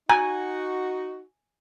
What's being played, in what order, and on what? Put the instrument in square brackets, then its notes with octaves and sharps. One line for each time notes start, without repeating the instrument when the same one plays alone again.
[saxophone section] D#4 F#4 [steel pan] G#5 [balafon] A#5